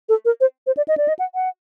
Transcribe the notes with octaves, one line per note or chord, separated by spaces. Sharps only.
A4
A#4
C5
C5
D5
D#5
D5
D#5
F#5
F#5